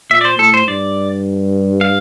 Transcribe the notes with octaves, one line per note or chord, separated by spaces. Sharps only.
A#2 E5
D5
C5
A2 A4
C5
G2 D5
F5